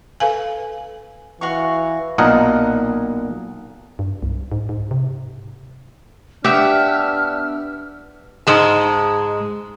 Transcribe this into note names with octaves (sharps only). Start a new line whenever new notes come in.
A4 B4 F5 G#5
E3 F#4 F5 C#6
B1 A#2 A#4 D#5 F#5
G2
C2
G#2
G#2
C3
B3 D4 G4 E5 F6
G#2 G#3 A5